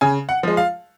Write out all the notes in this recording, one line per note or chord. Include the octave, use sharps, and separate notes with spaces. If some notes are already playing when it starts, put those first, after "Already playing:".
C#3 G#5
F#5
F3 G#3
F5